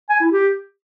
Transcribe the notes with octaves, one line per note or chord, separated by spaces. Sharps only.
G#5
E4
G4